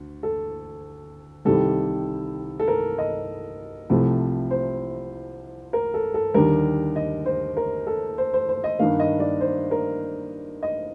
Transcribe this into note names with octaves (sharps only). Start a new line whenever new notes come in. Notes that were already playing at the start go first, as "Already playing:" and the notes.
Already playing: D2
A4
C2 C3 D#3 G3 A4
A4
A#4
D#5
C2 C3 F3 A3
C5
A#4
A4
A4
D#2 D3 G3 A#4
D#5
C5
A#4
A4
C5
C5
C5
D#5
G2 D#3 A#3 F5
D#5
D5
C5
A#4
D#5